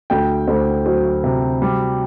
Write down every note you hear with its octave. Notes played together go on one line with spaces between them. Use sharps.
D2 G5
D2 C5
F#3 C5
C3
G3